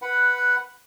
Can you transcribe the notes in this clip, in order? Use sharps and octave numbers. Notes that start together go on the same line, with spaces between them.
B4 F#5